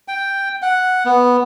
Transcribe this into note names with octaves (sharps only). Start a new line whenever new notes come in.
G5
F#5
B3